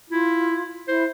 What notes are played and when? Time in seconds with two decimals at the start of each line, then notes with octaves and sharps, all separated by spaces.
0.10 E4 F4
0.88 E4 C5